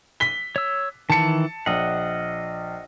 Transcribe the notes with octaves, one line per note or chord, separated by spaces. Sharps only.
B6 G7
C#5 E6
D#3 E3 A5 C#7
A#1 D#5 F#5